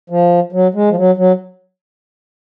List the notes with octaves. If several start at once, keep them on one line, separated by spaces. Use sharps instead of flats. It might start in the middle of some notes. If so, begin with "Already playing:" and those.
F3
F#3
G#3
F3
F#3
F#3